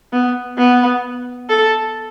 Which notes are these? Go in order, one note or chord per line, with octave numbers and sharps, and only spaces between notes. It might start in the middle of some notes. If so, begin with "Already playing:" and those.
B3
B3
A4